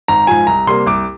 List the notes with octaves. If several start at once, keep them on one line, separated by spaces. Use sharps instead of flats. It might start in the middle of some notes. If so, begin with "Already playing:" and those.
G#1 A#5
G#2 F3 G#5
C2 A#5
C3 G3 A#3 C6
C2 D6